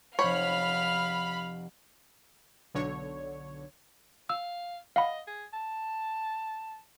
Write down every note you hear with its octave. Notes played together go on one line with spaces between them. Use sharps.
F1 C5 C#5 F5 F#5 B5 F6
B1 D3 C#5
F5 E6
D#5 F5 F#5 B5
G#4
A5